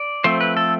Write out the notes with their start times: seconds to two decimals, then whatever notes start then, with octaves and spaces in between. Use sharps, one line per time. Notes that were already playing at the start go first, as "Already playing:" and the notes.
Already playing: D5
0.24 F3 A3 C4 C5
0.40 B4
0.57 A4